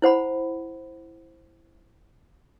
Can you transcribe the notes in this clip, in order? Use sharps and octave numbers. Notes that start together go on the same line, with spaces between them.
E4 C5 F#5 B5